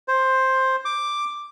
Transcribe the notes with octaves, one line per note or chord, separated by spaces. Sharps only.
C5
D6